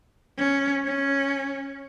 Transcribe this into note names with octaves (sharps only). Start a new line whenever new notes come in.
C#4
C#4